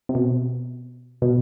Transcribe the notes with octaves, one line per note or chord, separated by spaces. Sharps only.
C3
B2
B2